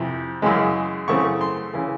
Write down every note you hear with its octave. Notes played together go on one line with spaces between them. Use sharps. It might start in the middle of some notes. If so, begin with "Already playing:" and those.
Already playing: F2 C3 E3
F#2 C#3 E3 G#3
F#2 C#3 E3 A3 C4 C#6
C6
C#3 E3